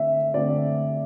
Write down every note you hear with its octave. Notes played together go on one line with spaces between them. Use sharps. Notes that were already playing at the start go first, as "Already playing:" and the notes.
Already playing: D3 A3 C4 E5
D3 A3 C4 D5